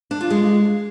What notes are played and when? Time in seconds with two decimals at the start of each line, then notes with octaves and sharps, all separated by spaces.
0.11 D4
0.21 F4
0.30 G#3